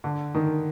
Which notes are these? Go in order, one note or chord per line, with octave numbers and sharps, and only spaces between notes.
D3
D#3